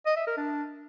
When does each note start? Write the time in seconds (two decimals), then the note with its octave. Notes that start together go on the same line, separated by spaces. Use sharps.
0.06 D#5
0.16 E5
0.27 A#4
0.37 D4